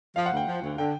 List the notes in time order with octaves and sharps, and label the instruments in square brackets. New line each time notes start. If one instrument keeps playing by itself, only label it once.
[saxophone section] F3 [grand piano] F5
[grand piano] F#5
[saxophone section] D2
[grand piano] G5
[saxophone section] F3
D2
[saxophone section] D3 [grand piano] G5